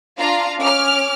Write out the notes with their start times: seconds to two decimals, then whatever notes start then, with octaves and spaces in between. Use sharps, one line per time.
0.19 D4 F4 F5 A#5
0.60 C#4 D6 F6